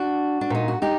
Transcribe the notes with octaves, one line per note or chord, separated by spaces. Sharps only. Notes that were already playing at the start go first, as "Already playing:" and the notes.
Already playing: D4 F#4
D4
A#2 D#4
F#4
D#4 G4